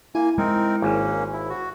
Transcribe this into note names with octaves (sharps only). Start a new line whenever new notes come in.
A#3 E4 G#5
G#3 C4 D#4 A#4
G#1 A#3 C#4
E4
F#4